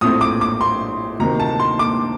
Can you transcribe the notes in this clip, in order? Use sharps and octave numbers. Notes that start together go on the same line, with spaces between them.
A#1 A2 A3 C4 D#6
D6
D6
C6
D2 C3 D#3 A#5
A5
C6
D6